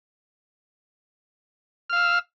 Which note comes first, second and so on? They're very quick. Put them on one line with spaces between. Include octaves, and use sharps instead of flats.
F6 F5 E6